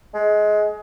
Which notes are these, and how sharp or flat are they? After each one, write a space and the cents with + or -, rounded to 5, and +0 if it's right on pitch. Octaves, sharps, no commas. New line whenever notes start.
G#3 +20